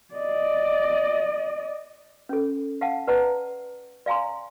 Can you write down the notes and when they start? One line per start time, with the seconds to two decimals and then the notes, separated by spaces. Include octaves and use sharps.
0.15 D5 D#5
2.29 C#4 A4
2.81 F5 F#5 A5
3.08 B4 D5 F#5 A5 A#5
4.06 D5 F5 G#5 A#5 C6